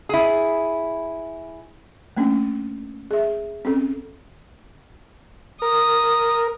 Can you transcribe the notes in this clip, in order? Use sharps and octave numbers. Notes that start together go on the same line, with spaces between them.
E4 G#4
A3 A#3 C#4 D4
G#4 E5
C4 C#4 A4
A#4 D#6